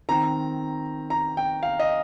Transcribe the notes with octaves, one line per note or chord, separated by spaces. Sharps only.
D#3 C4 A#5
A#5
G5
F5
D#5